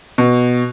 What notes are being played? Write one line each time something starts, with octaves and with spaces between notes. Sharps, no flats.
B2